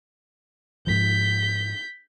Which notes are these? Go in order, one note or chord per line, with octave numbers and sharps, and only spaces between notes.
G#2 F3 G6 B6